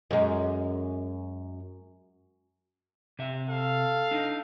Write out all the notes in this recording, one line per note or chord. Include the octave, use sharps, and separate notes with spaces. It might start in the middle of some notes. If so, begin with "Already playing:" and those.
F#2 G#3
C3 E5
A4 F5
D4 D#4